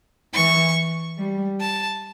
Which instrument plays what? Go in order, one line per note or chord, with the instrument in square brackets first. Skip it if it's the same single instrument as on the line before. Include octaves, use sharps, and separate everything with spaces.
[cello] E3 [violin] C#6
[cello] G3
[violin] A5